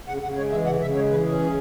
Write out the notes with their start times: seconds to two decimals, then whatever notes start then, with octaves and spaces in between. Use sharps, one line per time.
0.08 C#3 F#5
0.22 C#3 F#5
0.37 G#3 C#5
0.51 E3 E5
0.66 C#3 F#5
0.81 C#3 E5
0.95 G#3 C#5
1.10 E3 B4
1.24 C#4 G#4
1.39 C#3